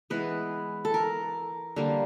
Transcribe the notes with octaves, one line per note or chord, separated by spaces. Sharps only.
E3 G#3 B3 B4
A4
A#4
D3 G3 A#3